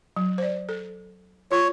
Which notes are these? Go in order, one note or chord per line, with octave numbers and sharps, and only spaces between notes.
F#3
C5 D5
A4
F4 C#5